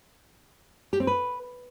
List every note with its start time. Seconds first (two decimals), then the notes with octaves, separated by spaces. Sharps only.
0.93 G4
1.00 C4
1.07 B4